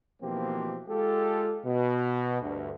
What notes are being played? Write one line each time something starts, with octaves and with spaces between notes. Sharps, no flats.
B2 E3 F3 A#3 C4 G4
G#3 F4 G4 A4
B2
D2 G2